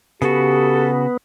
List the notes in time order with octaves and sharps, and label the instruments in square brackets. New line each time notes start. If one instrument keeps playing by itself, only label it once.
[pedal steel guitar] C#3 F#4 [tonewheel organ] B3 [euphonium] G4 [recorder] A4